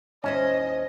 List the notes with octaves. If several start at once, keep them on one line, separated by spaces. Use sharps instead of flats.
D#2 C#4 E4 C5 D#5